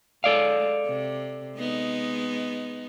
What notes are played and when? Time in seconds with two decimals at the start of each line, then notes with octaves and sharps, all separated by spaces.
0.24 G#3 A4 D5 F5
0.86 C3
1.58 G#3 B3 D#4